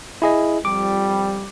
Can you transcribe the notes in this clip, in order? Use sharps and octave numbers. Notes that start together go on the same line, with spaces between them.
E4 G#4 D#5
F2 F3 G3 D6